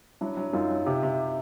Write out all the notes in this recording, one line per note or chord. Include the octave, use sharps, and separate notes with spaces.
F#3 D4 E4
F#3
F#2 D#4 F4
F#3
C3 F4 G4
C3